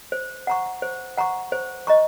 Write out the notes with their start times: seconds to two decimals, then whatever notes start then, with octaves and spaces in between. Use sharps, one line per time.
0.12 C5
0.47 F#5 A#5 C#6
0.82 C5
1.17 F#5 A#5 C#6
1.52 C5
1.87 D#5 A#5 C#6